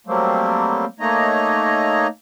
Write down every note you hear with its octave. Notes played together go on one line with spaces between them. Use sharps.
F#3 G3 A3 A#3 C4
A3 A#3 D#4 C#5 D#5 A#5